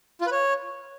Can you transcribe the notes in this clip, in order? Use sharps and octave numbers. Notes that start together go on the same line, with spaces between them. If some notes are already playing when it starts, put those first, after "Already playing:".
F4
B4
C#5